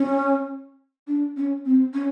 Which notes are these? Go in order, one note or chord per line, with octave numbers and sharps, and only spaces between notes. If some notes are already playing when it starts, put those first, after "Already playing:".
Already playing: C#4
D4
C#4
C4
C#4